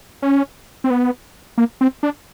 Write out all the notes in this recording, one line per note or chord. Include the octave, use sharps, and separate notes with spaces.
C#4
C4
B3
A#3
C4
D4